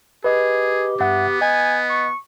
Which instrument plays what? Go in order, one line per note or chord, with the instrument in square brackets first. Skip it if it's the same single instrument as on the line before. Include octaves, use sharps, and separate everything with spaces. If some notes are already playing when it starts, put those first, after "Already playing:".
[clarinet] G4 [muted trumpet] G#4 [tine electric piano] B4 D#5
[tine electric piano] G2 E5 F#5 [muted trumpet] B3
[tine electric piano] D#5 [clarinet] G#5
[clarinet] C#6